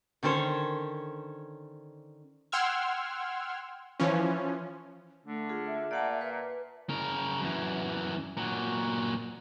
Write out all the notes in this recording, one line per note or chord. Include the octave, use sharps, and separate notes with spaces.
D3 D#3 C#4 C5 C#5
F#5 G5 C6 E6 F6 G#6
E3 F3 C#4
D3 A3
F4 G#4
E5
A#2 D5 F#5 A5
B4
C#3 A#4
F#2 E3
A#2 F#3